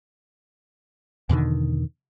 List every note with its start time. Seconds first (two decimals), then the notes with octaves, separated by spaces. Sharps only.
1.29 E2 B2 D3 D#3